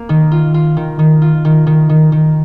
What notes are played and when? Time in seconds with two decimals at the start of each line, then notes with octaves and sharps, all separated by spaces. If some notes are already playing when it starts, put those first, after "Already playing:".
Already playing: A#3
0.09 D#3
0.31 F4
0.54 F4
0.77 D#3
0.99 D#3
1.22 F4
1.45 D#3
1.67 D#3
1.89 D#3
2.12 D#3